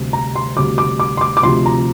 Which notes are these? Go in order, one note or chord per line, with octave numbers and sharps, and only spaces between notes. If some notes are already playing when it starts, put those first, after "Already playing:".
Already playing: D2 C3 G3
A#5
C6
D2 C3 G3 D6
D6
D6
C6
D6
D6
D2 C3 F3 C4 C6
A#5